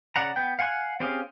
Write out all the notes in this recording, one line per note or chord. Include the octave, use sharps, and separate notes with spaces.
C#3 D5 F#5 A#5
B3 G5
F5 F#5 G#5 C6 F#6
C4 C#4 G4 G#4 F5